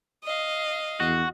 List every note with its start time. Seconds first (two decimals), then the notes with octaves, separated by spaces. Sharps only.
0.24 D#5 F5
1.00 E2 F#4